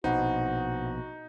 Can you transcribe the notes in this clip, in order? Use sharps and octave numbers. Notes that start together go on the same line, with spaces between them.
A#1 B2 D#4 F#4 C5 F#5